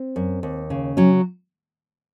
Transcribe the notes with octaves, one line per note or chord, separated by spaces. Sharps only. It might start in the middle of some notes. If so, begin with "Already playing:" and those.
Already playing: C4
F#2
D#2
C#3
F#3 C#4